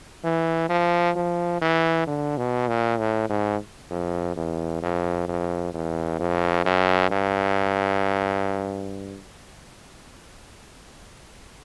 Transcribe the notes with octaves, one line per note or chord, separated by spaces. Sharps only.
E3
F3
F3
E3
D3
B2
A#2
A2
G#2
F2
E2
F2
F2
E2
F2
F#2
G2